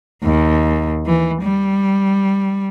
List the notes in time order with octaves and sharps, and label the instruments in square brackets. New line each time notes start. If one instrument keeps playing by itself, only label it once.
[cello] D#2
E3
G3